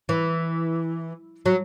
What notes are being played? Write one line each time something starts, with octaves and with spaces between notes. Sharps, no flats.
E3
F#3